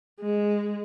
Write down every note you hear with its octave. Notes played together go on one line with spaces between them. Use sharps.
G#3